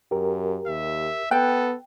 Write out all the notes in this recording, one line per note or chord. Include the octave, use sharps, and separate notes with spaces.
F#2 G4 A#4
D#2 E5
B3 A4 G5 F#6